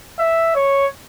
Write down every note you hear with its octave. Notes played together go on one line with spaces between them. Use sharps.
E5
C#5